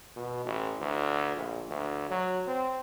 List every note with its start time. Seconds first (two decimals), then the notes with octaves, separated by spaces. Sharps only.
0.16 B2
0.45 A1
0.80 D2
1.37 A#1
1.69 D2
2.11 F#3
2.47 C4